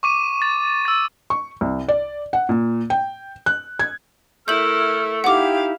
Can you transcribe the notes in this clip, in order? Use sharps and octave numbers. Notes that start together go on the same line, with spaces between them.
C#6 D6 D#7
A6
E6 A6
C#6
C2
D5
F#5
A#2
G5
F#6
G#6
A3 E4 A#4 E6 F6 G6 F#7
D#4 E4 G4 F5 F#5 D6